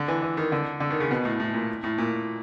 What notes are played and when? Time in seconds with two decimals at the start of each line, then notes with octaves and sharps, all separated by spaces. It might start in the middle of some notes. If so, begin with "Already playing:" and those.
Already playing: D3
0.08 E3
0.22 E3
0.37 D#3
0.52 D3
0.80 D3
0.90 D#3
1.00 C#3
1.11 B2
1.25 A2
1.40 A2
1.54 A#2
1.83 A2
1.98 A#2